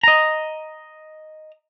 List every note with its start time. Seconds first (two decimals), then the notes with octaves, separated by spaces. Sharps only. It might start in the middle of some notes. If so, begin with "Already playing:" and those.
0.03 D#5 A#5